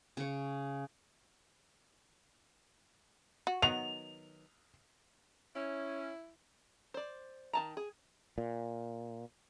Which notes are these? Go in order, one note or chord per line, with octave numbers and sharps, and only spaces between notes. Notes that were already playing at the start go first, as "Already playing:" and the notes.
C#3 C#5
F#4
D#3 F#3 B3 F7
C#4 E4
C5 D5
D#3 A5 A#5
G#4
A#2